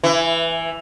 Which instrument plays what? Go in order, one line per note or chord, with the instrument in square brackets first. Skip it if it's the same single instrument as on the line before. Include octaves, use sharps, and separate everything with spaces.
[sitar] E3